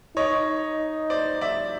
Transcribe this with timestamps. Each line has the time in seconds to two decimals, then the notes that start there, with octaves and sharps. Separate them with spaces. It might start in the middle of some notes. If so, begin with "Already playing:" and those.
0.17 D#4 C#5 D#5
1.10 C5 D5
1.41 D5 E5